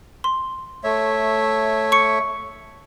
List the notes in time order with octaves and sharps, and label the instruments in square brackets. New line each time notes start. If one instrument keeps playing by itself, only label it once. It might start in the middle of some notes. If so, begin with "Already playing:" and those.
[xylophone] C6
[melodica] A3 C#5 E5
[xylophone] C#6 C#7